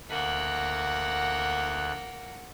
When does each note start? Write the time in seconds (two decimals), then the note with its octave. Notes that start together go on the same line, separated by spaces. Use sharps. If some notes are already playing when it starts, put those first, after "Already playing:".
0.10 D2 A#3 F#5 F#6